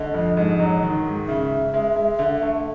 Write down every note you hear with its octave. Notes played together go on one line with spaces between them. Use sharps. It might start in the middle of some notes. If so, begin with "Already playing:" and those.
Already playing: D3 A3 D#5
F2
G#2
F#3
D#3
G#2
C#3 E5
C#3
G#3
G#3
D3
A3